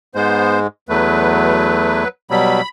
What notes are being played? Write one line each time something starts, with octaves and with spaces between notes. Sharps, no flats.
G#2 G#3 B3 C5
E2 F#3 A3 B4
B2 F#3 G3 B5